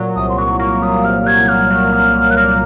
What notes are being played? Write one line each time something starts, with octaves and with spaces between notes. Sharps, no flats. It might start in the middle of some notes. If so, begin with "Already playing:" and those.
Already playing: A#2 F#3
C2 D#6
C6
F#3 C#6
A#3 C#6
A#2 D#6
C2 F6
F#3 G#6
A#2 F6
F#3
A#2
A#2
F#6
A#3 F6